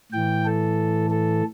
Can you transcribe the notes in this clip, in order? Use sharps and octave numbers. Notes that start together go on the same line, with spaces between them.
A2 E3 G5
A4
A4